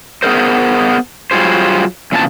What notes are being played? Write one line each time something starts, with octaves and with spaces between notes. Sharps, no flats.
B3 G#4 A#4 C5
F#3 G3 F4 G#4 C5
E2 A#2 C#3 C4 D4 A5